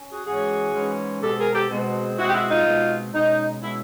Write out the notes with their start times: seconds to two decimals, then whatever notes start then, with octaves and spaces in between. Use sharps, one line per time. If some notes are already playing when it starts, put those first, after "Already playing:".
Already playing: C#4
0.10 F#4 G#4
0.25 G#2 E3 G#3 C#4 F#4 G#4
0.74 G#2 E3 G#3 C#4
1.22 B2 G#3 C4 G4 A4
1.37 G#4 A#4
1.53 G4 A4
1.69 B2 G#3 C4
2.17 B2 G#3 C4 E4 F#4
2.27 G4
2.33 E4 F#4
2.49 D#4 F4
2.65 B2 G#3 C4
3.13 B2 G#3 C#4 D#4
3.61 B2 G#3 C#4 E4